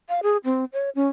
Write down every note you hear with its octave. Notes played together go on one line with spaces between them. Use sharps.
F5
G#4
C4
C#5
C#4